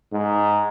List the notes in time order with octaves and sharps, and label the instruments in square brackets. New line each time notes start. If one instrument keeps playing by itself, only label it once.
[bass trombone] G#2